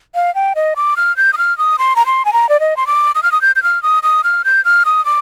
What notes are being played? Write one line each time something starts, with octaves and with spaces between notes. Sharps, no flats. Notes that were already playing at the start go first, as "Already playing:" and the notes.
F5
G5
D#5
D6
F6
G6
D#6
F6
D#6
C6
A#5
C6
G#5
A#5
D5
D#5
C6
D6
D#6
F6
D#6
G6
G6
F6
D#6
D#6
F6
G6
F6
D#6
D6